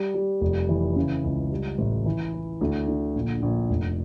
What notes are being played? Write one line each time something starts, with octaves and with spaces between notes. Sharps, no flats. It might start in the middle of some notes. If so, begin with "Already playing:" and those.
Already playing: G3
G3
F1
E3
C#3
C#2
G3
A1
E3
E4
D2
D3
A#1
A#1
F1